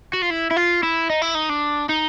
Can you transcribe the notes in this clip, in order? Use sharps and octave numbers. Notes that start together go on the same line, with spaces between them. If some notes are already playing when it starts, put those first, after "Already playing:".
F#4
F4
E4
E4
F4
E4
D#4
E4
D#4
D4
D#4